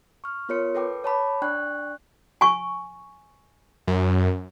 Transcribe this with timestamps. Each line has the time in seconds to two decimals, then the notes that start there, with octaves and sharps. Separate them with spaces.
0.24 C#6 F6
0.49 B3 F4 A#4 C#5 C6 C#7
0.75 A4 B4 G5 D6
1.04 C#5 A5 B5 D6
1.42 D4 D5 G5 C#6 F#6
2.41 G#5 C#6
3.87 F#2